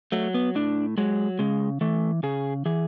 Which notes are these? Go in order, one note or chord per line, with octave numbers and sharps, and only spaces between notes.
F#3 A3
B3
A2 D4
F#3 G#3
C#3 G#3
E3 A3
C#3 G#4
E3 G#4